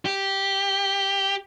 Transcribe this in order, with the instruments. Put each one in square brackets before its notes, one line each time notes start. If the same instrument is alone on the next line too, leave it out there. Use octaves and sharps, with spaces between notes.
[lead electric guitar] G4